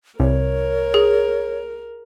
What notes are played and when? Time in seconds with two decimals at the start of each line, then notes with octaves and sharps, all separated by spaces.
0.20 C2 A#4 C#5
0.94 G#4